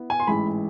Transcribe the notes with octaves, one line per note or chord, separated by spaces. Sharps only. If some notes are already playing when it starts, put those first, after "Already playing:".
Already playing: B3 E4
G#5
C6
A1 G#2 E3 G#3 B5